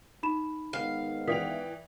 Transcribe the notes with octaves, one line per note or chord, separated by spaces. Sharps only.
D#4 B5 E7
G#2 D#3 B3 F5
E3 D5 G5 D#6 B6 F7